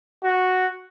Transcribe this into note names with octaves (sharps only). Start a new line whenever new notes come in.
F#4